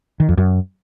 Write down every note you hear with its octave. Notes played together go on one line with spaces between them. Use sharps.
D#3
F2
F#2